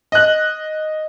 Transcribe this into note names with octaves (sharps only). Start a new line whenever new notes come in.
D#5 F#6